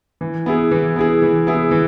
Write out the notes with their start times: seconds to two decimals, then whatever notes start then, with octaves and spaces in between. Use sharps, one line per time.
0.21 E3
0.46 B3 E4 G#4
0.71 E3
0.96 B3 E4 G#4
1.22 E3
1.47 B3 E4 G#4
1.71 E3